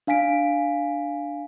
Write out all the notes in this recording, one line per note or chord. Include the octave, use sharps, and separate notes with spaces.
D4 F5 G#5 B6 D7